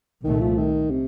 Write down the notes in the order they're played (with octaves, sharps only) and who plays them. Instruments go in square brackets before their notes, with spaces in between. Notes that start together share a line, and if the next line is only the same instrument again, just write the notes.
[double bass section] C2 A#2 A3 [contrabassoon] D#3
[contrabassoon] F3
D#3
C3